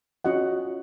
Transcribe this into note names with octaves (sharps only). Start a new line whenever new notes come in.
C#4 F4 F#4 D#5 F#5